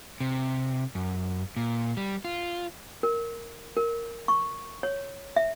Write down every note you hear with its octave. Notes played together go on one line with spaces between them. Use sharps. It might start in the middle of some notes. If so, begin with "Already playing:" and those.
C3
F#2
A#2
G3
F4
A#4
A#4
C#6
C#5
E5